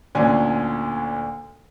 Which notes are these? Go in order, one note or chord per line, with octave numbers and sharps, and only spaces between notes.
D2 A#2 D3 C#4 G#5